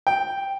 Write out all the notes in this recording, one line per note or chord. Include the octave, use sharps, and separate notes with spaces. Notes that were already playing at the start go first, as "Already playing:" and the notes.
G5